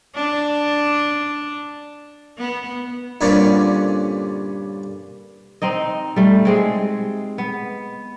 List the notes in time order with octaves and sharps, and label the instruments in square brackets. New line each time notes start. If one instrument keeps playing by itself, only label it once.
[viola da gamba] D4
B3
[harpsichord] G2 A#2 D3 C4 C#4
[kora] C4 D#4 D#5
G3 A3
G#3 C4 G#4
B3